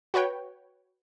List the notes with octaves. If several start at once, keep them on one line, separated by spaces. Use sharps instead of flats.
F#4 B4 C#5 G5